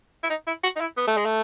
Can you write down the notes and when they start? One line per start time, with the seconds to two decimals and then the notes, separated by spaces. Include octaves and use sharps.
0.23 E4
0.29 D#4
0.47 E4
0.63 F#4
0.76 D#4
0.81 E4
0.97 B3
1.07 A3
1.17 G#3
1.25 A3